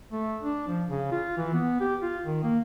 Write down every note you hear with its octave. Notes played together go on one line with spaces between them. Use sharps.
A3
D4
F3
C#3
F4
E3
B3
G4
F4
D#3
A#3